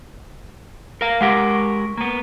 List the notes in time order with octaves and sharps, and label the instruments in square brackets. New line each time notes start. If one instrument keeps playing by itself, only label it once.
[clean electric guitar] A#4 F5
[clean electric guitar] G#3 G4 A#4 [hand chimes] F#5 D6 A#6
[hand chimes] C#6
[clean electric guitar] A#3 B3